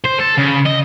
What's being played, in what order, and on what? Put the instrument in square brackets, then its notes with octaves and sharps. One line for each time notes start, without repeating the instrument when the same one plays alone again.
[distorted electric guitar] C5
A4
C#3
D#5